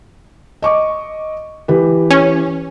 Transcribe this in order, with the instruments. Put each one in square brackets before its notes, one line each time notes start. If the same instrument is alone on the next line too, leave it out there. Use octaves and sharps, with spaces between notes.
[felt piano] D#5 C#6 D6
E3 G4 B4
[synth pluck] C#4